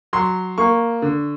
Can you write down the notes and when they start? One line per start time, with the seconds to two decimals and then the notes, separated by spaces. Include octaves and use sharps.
0.13 F#3 C6
0.58 A#3 C#6
1.02 D3